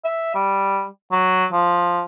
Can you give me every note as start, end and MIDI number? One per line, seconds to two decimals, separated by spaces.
0.05 0.34 76
0.34 0.87 55
1.12 1.46 54
1.52 2.03 53